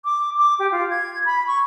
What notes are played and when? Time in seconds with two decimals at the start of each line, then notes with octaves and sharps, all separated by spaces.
0.05 D6
0.38 D6
0.59 G4
0.72 F4
0.90 G#6
1.25 B5
1.47 C#6